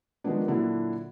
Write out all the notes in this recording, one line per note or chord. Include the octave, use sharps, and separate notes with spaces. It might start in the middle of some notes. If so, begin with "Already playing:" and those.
D#3 F3 G#3 B3 D4
A#2 D3 F#3 D4 E4